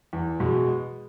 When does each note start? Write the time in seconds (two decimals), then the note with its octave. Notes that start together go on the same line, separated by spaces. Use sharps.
0.13 E2
0.40 B2 G#3